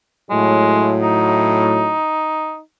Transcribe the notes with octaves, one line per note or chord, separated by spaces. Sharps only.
A2 F#3 G#3
D#4